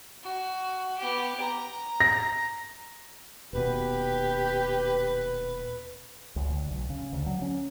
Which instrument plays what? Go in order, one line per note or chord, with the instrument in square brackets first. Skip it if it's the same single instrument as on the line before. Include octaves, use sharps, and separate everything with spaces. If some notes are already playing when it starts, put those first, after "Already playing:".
[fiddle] F#4
B3 G4
A#5
[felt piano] A#6
[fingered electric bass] D#1 B2 [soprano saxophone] G4 [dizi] B4
[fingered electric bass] C#2
D2
B1
C#3
D2
F#3
C#4